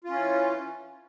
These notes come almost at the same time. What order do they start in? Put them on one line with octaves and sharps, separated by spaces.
F4 C#4 E3